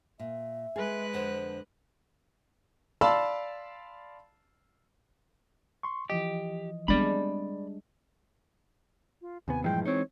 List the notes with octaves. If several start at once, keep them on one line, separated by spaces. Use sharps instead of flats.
A#2 E5
G#3 G#4 B4 F#6
F2 D3 C5 F#5
D5 F5 A5 B5 C6 E6
C6 C#6
E3 F3 G4 D#5
G3 G#3 B3 C4 D4 D5 B5
F4
D#2 C3 B3 G#5
G2 A#2 E3 F3 G#3 G5
C4 D#4 C#5